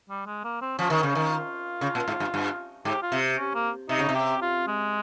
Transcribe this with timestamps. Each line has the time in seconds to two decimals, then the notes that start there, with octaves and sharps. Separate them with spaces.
0.09 G3
0.26 G#3
0.44 A#3
0.61 C4
0.78 F3 C#4
0.90 D#3
1.03 C#3
1.15 D#3
1.30 F4
1.81 C#3
1.95 A#2
2.08 G#2
2.20 G2
2.34 G2
2.85 G#2 G4
3.02 F4
3.12 C3
3.37 C#4
3.54 A#3
3.89 C3 D#4
3.99 C#3
4.09 C3
4.15 G4
4.41 F4
4.67 G#3